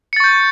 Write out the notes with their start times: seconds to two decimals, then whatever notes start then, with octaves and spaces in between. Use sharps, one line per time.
0.13 C#7
0.16 A6
0.20 C#6
0.24 G6